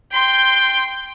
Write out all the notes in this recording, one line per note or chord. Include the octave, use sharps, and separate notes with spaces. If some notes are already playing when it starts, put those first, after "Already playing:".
G5 C6